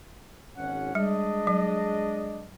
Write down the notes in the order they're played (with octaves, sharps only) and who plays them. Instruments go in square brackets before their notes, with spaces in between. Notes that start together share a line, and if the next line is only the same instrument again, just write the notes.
[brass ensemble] G#1 C#4 F#5
[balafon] G3 [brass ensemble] G#3 D4 D#5
[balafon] F#3